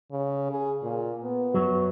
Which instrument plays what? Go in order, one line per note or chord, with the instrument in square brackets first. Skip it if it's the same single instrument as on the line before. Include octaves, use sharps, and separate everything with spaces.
[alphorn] C#3
G#4
A#2
B3
[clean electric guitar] F#2 F#3